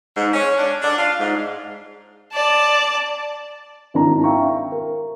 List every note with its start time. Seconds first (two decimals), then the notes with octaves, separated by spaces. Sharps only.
0.15 G#2
0.34 C#4
0.58 D4
0.82 D4
0.98 F4
1.20 G#2
2.32 D5 A5
3.94 G#1 D#3 D4 E4 A#5
4.23 E5 F5 G5 A#5 C#6
4.72 A#4